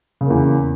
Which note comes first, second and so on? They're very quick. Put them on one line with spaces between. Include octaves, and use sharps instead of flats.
C#3 A#3 E2